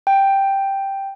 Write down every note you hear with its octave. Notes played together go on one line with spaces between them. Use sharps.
G5